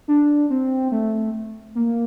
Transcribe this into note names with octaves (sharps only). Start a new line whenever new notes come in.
D4
C4
A3
A#3